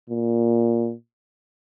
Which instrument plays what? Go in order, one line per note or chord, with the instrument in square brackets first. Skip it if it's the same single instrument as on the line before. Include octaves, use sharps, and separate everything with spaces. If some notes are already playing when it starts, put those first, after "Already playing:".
[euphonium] A#2